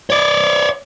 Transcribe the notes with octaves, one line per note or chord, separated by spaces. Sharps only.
C#5 D5